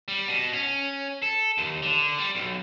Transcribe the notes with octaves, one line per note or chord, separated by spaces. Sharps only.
G3
B2
C#4
A4
D#2
D3
G3
B1